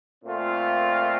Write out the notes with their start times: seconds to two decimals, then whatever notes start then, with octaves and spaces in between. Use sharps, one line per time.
0.24 A#2 A3 C4 F4